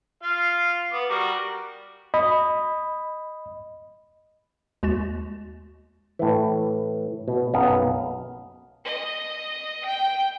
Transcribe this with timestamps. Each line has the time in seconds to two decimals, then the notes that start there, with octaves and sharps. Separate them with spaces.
0.23 F4 F5
0.91 B3 D6
1.10 G3 F#4 A#4
2.14 D#5 B5
4.83 D#2 G#3 F#4 A6 E7
6.19 A2 E3
7.28 B2
7.54 B1 F#2 B3 D#5 F5
8.85 D#5
9.85 G5